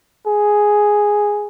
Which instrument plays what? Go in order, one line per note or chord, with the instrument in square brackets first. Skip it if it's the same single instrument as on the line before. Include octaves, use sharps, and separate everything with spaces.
[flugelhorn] G#4